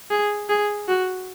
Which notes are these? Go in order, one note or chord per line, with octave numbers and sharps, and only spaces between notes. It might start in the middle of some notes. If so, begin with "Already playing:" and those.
G#4
G#4
F#4